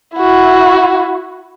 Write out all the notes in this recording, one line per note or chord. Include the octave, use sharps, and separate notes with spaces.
E4 F#4